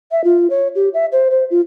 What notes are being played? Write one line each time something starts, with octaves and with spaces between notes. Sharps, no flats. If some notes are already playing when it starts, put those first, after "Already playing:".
E5
F4
C#5
G4
E5
C5
C5
F4